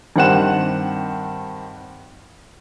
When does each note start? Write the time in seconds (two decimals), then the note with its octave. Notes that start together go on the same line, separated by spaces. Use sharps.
0.16 G2 D#3 C4 F#5 F#6 E7